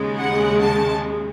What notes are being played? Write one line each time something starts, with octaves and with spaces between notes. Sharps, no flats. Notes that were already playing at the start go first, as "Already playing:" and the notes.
Already playing: D#2 C#3 G#3
F#5
A5